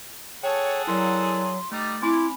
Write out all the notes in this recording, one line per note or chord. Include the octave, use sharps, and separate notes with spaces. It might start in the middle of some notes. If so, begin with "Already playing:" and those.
G#4 A4 C#5 F#5 G5 A5
F#3 E4 A#4 D5 C6
G3 A3 D#4 D5 D6 A6
C4 E4 G#5 B5 C6 D6